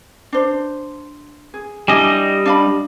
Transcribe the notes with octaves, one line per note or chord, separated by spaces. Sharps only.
D4 C5
G#4
G3 D4 E4 D#5 G#5
D4 F5 B5